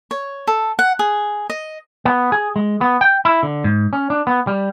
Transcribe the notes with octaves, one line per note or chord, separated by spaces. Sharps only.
C#5
A4
F#5
G#4
D#5
B3
G#4
G#3
B3
G5
E4
D3
G#2
C#4
D4
B3
G3